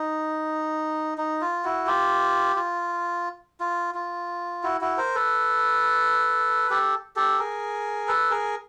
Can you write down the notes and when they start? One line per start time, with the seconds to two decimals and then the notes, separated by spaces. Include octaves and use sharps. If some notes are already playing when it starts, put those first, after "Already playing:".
Already playing: D#4
1.18 D#4
1.42 F4
1.64 E4 F#4
1.87 F4 G4
2.56 F4
3.60 F4
3.95 F4
4.64 E4 F#4
4.81 E4 F#4
4.98 A#4 C5
5.15 A4 B4
6.70 G4 A4
7.16 G4 A4
7.39 G#4 A#4
8.08 A4 B4
8.31 G#4 A#4